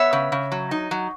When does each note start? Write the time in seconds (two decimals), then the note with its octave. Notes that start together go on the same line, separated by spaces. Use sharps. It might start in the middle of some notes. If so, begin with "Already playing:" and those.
Already playing: B3 C#5 E5
0.13 C#3
0.32 C#3
0.52 F#3
0.71 D#4
0.91 F#3